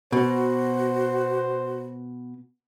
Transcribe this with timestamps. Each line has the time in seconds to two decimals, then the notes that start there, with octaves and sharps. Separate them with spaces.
0.12 B2 F#4 C5